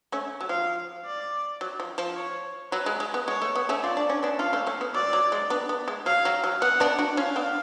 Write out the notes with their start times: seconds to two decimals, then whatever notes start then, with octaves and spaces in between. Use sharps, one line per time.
0.12 A3 C#4
0.41 F#3
0.49 F3 F5
1.05 D5
1.61 F#3
1.80 F3
1.98 F3
2.16 C#5
2.72 F#3 B4
2.86 G#3
3.00 G#3
3.14 B3
3.28 G#3 C#5
3.42 A3
3.55 B3
3.69 A3 C#4
3.83 F4 D5
3.97 D4
4.10 C#4
4.23 B3 D4
4.39 C#4 F4 F5
4.53 A3 C#4
4.67 A3 C#4
4.81 B3
4.94 F#3 D5
5.13 F#3
5.32 G#3
5.50 B3 D4
5.69 B3
5.88 G#3
6.06 F#3 F5
6.25 F#3
6.44 F#3
6.61 B3 F#5
6.80 B3 D4
6.99 D4 F#4
7.17 C#4 F4 F5
7.36 B3 D4